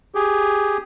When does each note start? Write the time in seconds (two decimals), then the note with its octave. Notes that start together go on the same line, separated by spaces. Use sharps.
0.15 G4 G#4